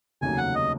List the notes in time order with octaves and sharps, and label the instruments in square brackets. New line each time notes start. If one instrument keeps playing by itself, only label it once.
[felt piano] F1 D#2 C#3 F#3 [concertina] G#5
[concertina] F#5
D#5